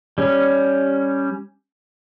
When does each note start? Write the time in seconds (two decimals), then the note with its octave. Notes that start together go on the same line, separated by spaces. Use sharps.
0.18 G3 C#4